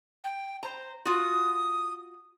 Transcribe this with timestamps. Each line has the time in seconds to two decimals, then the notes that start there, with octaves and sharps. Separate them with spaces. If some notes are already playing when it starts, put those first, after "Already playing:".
0.24 G5
0.63 C5 A#5
1.05 F4 F#4 D#6